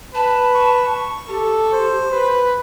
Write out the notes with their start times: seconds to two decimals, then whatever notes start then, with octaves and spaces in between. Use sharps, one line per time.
0.15 B4 A5
0.54 C#6
1.28 G4 A4
1.72 C5
2.11 B4